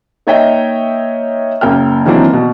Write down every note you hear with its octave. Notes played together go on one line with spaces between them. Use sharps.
A#3 D#4 C#5 D#5 E5 G5
F#1 A#3 G5 F6
D#3 E3 F#3 A#3 C4 D4
B2